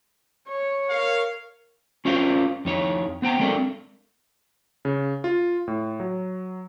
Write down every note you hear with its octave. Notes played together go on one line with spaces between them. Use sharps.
C#5
A#4 F5
C#4 F4 A#4 C5 F5
F2 D#4 C#5
B3 C5 G5 A#5
G#3 C4 D4 A4 A#4
C#3
F4
A2
F#3